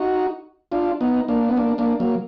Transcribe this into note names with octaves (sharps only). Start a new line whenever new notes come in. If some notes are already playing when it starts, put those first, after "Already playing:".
Already playing: D#4 F#4
D4 F4
B3 D#4
A#3 D4
B3
A#3 D4
A#3 D4
F#3 A#3